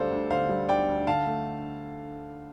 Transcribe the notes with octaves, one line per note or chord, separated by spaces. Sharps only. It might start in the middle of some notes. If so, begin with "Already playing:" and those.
Already playing: D2 D3 G3 A4 C5 D5 F5
D2
D3 C5 F5
G3
D2 D5 G5
D2
D3 F5 A5
A3